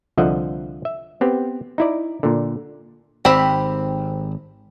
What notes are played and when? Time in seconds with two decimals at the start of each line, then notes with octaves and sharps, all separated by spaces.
0.17 C2 D3 F3 D#5 E5 F#5
0.85 E5
1.21 B3 C4 G4
1.78 D#4 E4 D5
2.23 A#2 D3
3.25 G#1 C4 G4 B5